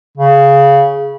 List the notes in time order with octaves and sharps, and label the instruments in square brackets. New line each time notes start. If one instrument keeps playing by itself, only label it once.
[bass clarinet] C#3